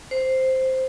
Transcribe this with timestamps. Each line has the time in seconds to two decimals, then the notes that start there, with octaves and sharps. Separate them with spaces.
0.11 C5